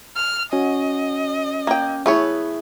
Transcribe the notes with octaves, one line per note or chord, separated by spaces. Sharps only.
F6
C#4 F#4 D#5
A#3 G5
A3 B3 E4 G#4 C#5